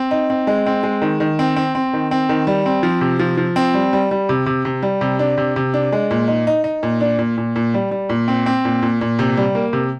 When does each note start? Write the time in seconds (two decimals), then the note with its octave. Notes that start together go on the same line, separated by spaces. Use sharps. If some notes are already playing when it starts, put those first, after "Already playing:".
Already playing: C4
0.11 D#4
0.30 C4
0.47 G#3
0.66 C4
0.83 G#3
1.02 D#3
1.20 D#3
1.39 C4
1.56 C4
1.75 C4
1.93 D#3
2.11 C4
2.29 D#3
2.47 G3
2.66 C4
2.83 F3
3.01 C3
3.19 F3
3.37 F3
3.56 C4
3.74 G3
3.93 G3
4.11 G3
4.29 C3
4.46 C3
4.65 C3
4.83 G3
5.01 C3
5.19 D4
5.38 C3
5.56 C3
5.74 D4
5.93 G#3
6.11 A#2
6.28 D#4
6.47 D#4
6.64 D#4
6.83 A#2
7.01 D4
7.18 A#2
7.38 A#2
7.56 A#2
7.74 G3
7.91 G3
8.09 A#2
8.28 C4
8.46 C4
8.65 A#2
8.82 A#2
9.01 A#2
9.19 C3
9.37 G3
9.55 A#3
9.73 C3